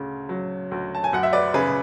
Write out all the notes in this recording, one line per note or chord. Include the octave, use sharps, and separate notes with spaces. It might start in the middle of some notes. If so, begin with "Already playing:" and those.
Already playing: D2 C#3
F#3
D2
A5
G#5
F#2 F#5
E5
B4 D5
C#3 G#4 B4